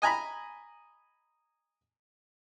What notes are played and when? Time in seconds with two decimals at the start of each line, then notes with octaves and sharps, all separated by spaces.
0.02 D#5 G#5 A#5 B5